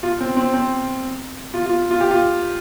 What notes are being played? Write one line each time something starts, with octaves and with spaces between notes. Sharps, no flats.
F4
C4
C4
C4
F4
F4
F4
G4
F4